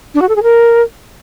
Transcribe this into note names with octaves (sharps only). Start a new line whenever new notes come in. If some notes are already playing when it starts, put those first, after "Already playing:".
D4
F#4
A4
G#4
A#4